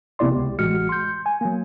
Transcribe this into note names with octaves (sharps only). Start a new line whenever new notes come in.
A#1 C3 B3 E4 D5 C6
C#2 G4
A1 G#3 F#4 F6 C#7
C6 G6
G#5
F#3 A#3